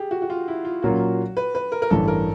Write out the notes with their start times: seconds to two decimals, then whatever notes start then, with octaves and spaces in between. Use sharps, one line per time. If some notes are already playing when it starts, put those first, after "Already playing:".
Already playing: G4 G#4
0.11 F#4
0.22 F#4
0.30 F4
0.48 E4
0.65 F4
0.82 A#2 F#3 A#3 C#4 F4 F#4
1.37 B4
1.55 B4
1.72 A#4
1.82 A#4
1.90 A1 G2 E3 A4
2.08 A#4